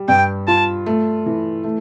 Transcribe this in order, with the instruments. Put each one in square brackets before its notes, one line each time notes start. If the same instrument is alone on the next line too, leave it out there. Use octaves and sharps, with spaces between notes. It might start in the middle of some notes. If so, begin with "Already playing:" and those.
Already playing: [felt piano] G3
[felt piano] G2 [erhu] G5
[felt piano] F4 [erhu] A5
[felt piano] A3
E3
A3